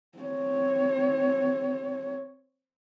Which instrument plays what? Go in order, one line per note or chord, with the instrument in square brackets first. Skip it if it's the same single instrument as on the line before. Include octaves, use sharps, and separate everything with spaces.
[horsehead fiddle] C4 C#5